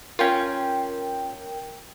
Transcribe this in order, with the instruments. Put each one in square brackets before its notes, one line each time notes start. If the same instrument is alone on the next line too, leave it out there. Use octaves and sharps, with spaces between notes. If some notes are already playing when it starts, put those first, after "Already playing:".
[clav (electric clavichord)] C#4 F4 [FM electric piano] A#4 G5